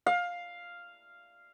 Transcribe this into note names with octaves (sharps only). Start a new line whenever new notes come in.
F5